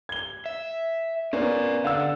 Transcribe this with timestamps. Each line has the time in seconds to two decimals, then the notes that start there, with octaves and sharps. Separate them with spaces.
0.09 G#6 G7
0.46 E5
1.33 B3 C#4 A#4 D5
1.84 D3 D4 F5 F#5 E6